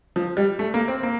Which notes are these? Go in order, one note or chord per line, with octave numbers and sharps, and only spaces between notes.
F3
G3
A3
A#3
C4
A#3